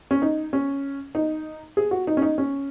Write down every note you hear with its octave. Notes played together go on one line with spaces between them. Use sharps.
C#4
D#4
C#4
D#4
G#4
F#4
D#4
C#4
D#4
C#4